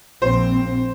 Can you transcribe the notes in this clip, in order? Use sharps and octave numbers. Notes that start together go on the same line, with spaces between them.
A#1 C4 C5